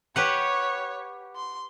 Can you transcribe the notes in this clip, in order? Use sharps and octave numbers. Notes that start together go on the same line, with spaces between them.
G4 B4 C#5 F#5
C6